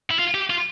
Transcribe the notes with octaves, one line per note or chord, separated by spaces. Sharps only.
E4
F4
G4
F4